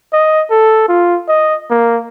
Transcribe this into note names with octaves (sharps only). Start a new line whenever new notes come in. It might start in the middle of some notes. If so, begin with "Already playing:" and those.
D#5
A4
F4
D#5
A#3